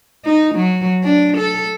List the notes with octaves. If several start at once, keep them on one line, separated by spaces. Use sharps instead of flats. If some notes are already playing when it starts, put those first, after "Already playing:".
D#4
F#3
D4
A4